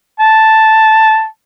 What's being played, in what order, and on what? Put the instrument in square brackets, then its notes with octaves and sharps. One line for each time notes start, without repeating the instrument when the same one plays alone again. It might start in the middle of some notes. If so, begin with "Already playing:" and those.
[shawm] A5